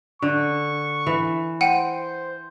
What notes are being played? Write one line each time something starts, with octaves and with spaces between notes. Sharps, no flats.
D3 C#6
E3
C5 F#5 G5 D#7